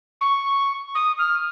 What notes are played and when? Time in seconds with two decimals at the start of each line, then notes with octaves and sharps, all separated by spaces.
0.21 C#6
0.95 D#6
1.19 F6